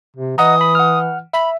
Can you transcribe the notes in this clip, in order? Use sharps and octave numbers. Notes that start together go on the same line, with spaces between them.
C3
E3 D#5 F#5 A#5 D#6
B5
F#5 F6
E5 B5